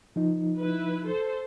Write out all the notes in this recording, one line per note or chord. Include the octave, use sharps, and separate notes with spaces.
F3 D#4
E4 B4
A4 C5